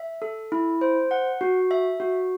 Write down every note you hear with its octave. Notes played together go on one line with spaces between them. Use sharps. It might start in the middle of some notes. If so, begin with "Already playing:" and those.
Already playing: E5
A4
E4
C5
F#5
F#4
E5
F#4